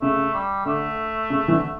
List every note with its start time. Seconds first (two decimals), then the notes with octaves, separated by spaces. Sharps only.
0.02 C#3 A3
0.34 G3
0.65 D3 A3
1.30 C#3
1.48 E3
1.53 D3